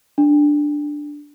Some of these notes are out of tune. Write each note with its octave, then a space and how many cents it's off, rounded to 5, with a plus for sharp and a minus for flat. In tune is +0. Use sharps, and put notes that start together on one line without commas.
D4 +5